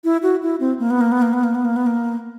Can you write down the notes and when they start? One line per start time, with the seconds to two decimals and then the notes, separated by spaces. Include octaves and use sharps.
0.04 E4
0.23 F#4
0.43 E4
0.60 C4
0.79 A#3
0.90 B3
1.01 A#3
1.12 B3
1.22 A#3
1.33 B3
1.44 A#3
1.55 B3
1.65 A#3
1.76 B3
1.86 A#3